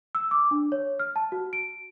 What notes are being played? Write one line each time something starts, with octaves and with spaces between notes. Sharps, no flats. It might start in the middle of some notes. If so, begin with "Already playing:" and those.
E6
D6
D4
C#5
F6
A5
F#4
D7